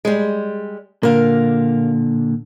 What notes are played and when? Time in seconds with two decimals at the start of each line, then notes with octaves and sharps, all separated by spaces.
0.05 G3 G#3
1.03 A#2 D3 A#4 F5